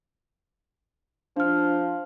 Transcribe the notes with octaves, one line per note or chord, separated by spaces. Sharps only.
F3 D4 F6